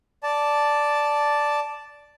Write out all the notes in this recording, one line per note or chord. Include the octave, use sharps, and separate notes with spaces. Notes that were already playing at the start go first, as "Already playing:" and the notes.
D5 A5